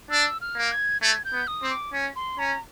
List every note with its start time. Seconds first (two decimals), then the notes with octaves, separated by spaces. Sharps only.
0.10 D4 E6
0.41 F6
0.56 A#3
0.72 G#6
1.02 A3 G#6
1.25 G6
1.32 B3
1.47 D#6
1.63 C4
1.70 D6
1.93 C#4
2.16 C6
2.39 C#4 A#5